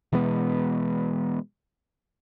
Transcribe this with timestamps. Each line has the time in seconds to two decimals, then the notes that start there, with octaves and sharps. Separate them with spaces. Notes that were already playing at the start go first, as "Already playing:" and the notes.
0.12 B2 E3 G#3 B3